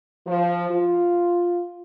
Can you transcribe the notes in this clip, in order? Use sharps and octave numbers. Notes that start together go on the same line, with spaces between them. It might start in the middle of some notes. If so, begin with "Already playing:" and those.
F3
F4